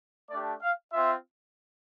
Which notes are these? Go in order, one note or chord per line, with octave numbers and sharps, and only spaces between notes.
A3 D4 G4 D5
F5
C4 F4 E5